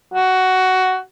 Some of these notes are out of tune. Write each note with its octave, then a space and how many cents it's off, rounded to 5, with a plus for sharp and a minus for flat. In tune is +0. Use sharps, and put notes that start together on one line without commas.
F#4 +10